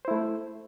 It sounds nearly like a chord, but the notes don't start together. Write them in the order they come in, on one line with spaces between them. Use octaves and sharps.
C5 E4 A3